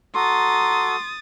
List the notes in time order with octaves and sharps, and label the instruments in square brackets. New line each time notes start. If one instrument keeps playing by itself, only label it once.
[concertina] F#4 A4 [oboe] A#5 [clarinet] C6 [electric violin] D#6 A6